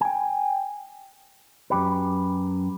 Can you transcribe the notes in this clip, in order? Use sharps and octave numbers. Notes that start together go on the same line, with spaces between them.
G5 G#5
F#2 G4 B4